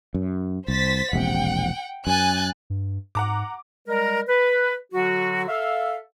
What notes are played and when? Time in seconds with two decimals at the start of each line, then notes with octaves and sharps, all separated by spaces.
0.14 F#2
0.68 C2 C5 A6 B6
1.13 E1 A#1 C3 F#5 G5
2.07 F#2 G#5 F#6 A6
2.70 G2
3.15 G#2 F#5 A#5 D6
3.88 G3 G#3 A#4
4.27 B4
4.92 D3 F#3 F#4
5.48 A4 E5 F5